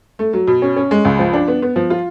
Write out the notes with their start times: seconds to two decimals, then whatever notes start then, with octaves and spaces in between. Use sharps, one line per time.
0.19 A3
0.33 F#3
0.47 B2
0.62 C#4
0.76 C#4
0.91 G#3
1.05 C#2
1.19 F3
1.33 D4
1.48 B3
1.62 B3
1.76 F3
1.90 F4